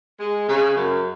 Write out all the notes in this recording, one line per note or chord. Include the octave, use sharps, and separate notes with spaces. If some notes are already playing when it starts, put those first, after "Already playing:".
G#3
C#3
F#2